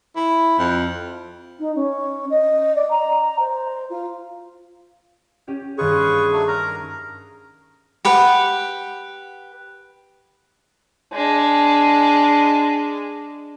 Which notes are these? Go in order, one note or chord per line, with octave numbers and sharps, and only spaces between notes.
E4
F2
D#4
C#4
D#5
D5
A#5
C5
F4
C#4 G4 G5
G2 D#3 F4 G#4 B4 C#5 C#6
F#3 A3 D4
A#4 A#5
G4 B4 F#5
G#3 D4